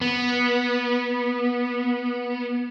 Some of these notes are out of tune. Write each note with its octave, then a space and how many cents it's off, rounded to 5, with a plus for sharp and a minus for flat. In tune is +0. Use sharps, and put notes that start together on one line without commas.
B3 -20